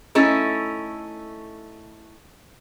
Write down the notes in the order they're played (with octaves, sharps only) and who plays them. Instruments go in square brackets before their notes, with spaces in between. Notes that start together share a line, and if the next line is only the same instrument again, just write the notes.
[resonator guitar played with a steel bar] A3 C#4 D#4 E4